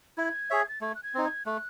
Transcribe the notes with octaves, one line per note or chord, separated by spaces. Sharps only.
E4 G#6
G#4 C#5 E5
A6
A3 G#6
F#6
G#6
C4 D#4
G#6
A3 F#6